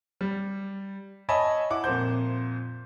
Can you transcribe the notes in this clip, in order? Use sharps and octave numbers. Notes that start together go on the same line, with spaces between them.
G3
C#5 D#5 E5 G#5 A5 B5
E4 F#5 D6
F2 A#2 C5 G6